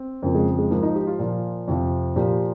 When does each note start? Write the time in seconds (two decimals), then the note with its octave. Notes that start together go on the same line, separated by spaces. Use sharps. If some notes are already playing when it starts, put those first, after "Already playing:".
Already playing: C4
0.23 F2 C#3 F3 A#3
0.35 G#3
0.59 G#3
0.71 G#2 F3 A#3
0.83 D#4
0.95 G4
1.07 F4
1.19 A#2 F3
1.68 F2 C3 F3
2.16 A#2 F3 G4